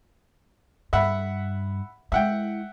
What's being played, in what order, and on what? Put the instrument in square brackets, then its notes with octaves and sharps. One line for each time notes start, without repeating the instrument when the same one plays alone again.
[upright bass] G2 [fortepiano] E5 F#5 B5
[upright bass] G#3 E4 [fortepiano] E5 F#5 G5